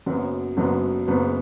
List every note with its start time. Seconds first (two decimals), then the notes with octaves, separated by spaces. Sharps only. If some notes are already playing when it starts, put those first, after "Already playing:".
0.06 F#1 F#2 F#3 B3
0.57 F#1 F#2 F#3 B3
1.07 F#1 F#2 C#3 B3